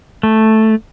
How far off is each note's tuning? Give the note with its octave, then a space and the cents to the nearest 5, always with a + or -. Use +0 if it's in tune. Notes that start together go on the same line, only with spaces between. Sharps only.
A3 +0